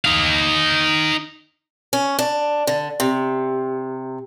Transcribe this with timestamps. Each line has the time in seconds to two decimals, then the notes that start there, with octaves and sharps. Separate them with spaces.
0.05 D#4 F5
1.93 C#4
2.19 D4
2.67 D3
3.00 C3